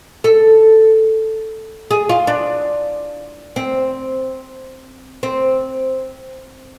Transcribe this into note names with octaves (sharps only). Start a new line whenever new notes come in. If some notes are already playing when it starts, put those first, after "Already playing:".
A4
G#4
F4
D4
C4
C4